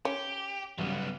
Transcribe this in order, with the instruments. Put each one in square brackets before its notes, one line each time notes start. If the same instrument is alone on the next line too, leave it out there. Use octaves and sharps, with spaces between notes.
[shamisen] C#4 [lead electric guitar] G4
[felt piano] B1 G2 C#3 [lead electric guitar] G3 B3